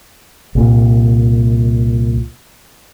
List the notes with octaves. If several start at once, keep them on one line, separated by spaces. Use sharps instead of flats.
C2 A#2